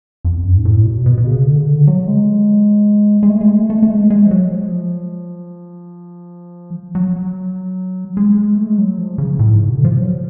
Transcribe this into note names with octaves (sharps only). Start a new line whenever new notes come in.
F2
F#2
G#2
A2
B2
B2
B2
C#3
D3
C#3
D3
F#3
G#3
G#3
A3
G#3
A3
A3
A3
G#3
G#3
F3
F#3
F3
F#3
G#3
A3
G#3
F#3
F3
C#3
A2
G#2
B2
D3
F3
F#3